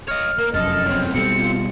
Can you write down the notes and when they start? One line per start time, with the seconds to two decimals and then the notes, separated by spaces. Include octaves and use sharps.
0.08 C#5 D#5 F6
0.38 A#3 A#4
0.54 F1 F#2 A4 D#5 F6
0.86 E2 C4 C#5
1.15 B2 G3 C4 A4 C#7
1.36 F4